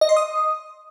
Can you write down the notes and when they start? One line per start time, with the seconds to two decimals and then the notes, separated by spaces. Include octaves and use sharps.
0.01 D#5
0.09 C6
0.16 D#6